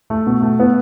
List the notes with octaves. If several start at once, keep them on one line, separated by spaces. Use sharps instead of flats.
A3
B2
A3
B3